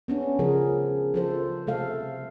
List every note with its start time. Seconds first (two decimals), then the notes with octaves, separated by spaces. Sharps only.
0.08 B3 C#4 D4
0.39 C#3 F3 G#4 A#4
1.14 F3 A4 C5
1.67 C3 A3 A4 F5